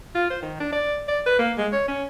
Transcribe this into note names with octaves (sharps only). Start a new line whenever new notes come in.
F4
C5
D#3
D4
D5
D5
B4
A#3
G#3
C#5
C#4